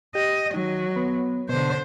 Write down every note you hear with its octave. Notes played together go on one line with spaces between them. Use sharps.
G4 D#5
D#3 F#3
B3
B2 D3 C5